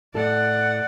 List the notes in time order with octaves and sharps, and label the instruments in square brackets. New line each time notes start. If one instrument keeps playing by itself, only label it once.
[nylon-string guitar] A2 A4 [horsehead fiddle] D5 F#5